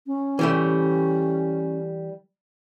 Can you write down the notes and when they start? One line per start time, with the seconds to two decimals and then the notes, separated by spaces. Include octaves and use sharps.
0.07 C#4
0.39 E3 G3 A3